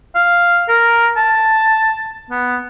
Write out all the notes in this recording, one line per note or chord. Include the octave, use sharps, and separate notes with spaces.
F5
A#4
A5
B3